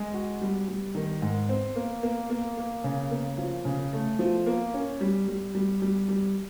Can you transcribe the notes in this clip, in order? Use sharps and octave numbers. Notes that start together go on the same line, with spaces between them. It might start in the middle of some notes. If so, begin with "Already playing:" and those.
Already playing: G#3
F#4
G3
G3
D#3
G#2
C4
A#3
A#3
A#3
A#3
C#3
A#3
F3
C#3
A3
F3
A#3
C#4
G3
G3
G3
G3
G3